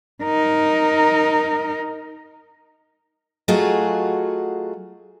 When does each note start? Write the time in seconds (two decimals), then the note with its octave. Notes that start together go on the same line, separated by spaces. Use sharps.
0.23 D#4 A#4
3.48 F#3 A3 F4 F#4 G#4 D#5